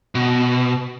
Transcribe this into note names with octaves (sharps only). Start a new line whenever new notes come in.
B2